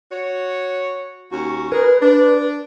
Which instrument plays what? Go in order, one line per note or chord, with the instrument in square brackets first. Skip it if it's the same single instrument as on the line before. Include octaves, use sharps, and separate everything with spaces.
[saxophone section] F#4 C#5
D#2 C#4 F#4
[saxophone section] G#4 A#4 [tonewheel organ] B4
[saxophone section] D4